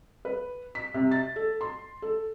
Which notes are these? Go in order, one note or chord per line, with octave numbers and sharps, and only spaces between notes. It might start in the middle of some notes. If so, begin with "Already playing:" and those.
B4
B6
C3
A6
A4
C6
A4